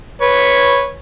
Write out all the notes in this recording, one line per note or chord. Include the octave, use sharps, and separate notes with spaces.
B4 C#5